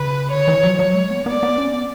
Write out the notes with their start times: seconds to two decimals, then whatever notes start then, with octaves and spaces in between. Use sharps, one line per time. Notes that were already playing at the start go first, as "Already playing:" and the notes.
Already playing: C#3 B4
0.31 D3 C#5
0.48 E3
0.64 F#3
0.79 F#3 C#5
0.95 G#3
1.11 B3
1.26 B3 D5
1.43 B3
1.58 C#4
1.73 B3